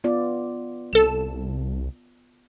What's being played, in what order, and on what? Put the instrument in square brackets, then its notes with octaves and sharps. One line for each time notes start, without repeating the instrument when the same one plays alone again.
[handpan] B3 F4 D5
[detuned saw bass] C2 [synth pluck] A4 E7